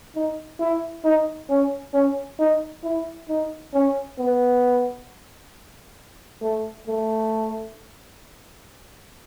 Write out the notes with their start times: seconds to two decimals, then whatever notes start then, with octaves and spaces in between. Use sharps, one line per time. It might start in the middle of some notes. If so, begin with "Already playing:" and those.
0.15 D#4
0.60 E4
1.04 D#4
1.50 C#4
1.94 C#4
2.39 D#4
2.84 E4
3.29 D#4
3.74 C#4
4.18 B3
6.42 A3
6.87 A3